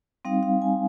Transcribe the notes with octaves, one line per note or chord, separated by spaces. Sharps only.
G3 C4 D#4 F5
F5
G#5